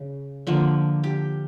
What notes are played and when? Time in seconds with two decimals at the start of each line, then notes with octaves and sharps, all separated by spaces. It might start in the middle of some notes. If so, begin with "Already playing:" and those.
Already playing: C#3
0.47 D3 F3 A#3
1.04 G4